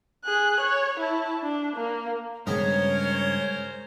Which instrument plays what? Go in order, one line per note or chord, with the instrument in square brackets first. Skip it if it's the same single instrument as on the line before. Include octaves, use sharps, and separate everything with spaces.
[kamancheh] G#4 F#6
C#5
E4 A5
D4
A#3
[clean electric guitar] G2 C#3 [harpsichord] G#3 B3 [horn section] C#4 A#4 C5 [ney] C#5